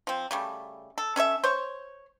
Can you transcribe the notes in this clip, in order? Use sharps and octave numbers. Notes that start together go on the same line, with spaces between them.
F3 C4
C#3 G3 A3
A4
C#4 A4 C#5 E5
C5 C#5